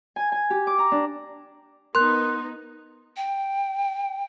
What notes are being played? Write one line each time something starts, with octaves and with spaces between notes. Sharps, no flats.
G#5
G#5
G4
D6
A#5
D4
B3 D#4 A#4 C6 F#6
G5